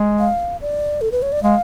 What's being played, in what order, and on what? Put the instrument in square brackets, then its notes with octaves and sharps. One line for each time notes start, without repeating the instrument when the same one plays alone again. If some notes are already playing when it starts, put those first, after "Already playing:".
Already playing: [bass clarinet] G#3
[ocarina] F5
D5
A4
B4
C#5
D5
[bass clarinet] G#3 [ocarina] F5